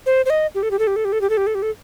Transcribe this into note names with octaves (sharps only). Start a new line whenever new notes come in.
C5
C5
D#5
G4
A4
G4
A4
G4
A4
G4
A4
G4
A4
G4
A4
G4
A4